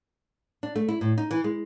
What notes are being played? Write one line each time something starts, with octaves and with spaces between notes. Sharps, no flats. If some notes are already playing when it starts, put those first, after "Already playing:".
D4
A3
E4
A2
D#4
E3
G#3